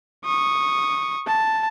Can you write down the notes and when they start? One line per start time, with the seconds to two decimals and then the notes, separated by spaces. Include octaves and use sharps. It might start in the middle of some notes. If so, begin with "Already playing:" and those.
0.25 C#6 D#6
1.27 A5